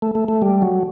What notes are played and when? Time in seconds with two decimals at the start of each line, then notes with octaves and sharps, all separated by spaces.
0.02 A3
0.15 A3
0.28 A3
0.42 G3
0.62 F#3